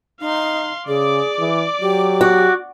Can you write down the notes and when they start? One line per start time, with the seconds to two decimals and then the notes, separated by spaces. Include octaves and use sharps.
0.20 D#4 F5 C6
0.88 C#3 G#4 D5 D6
1.39 E3
1.82 F#3 G4
2.21 F#4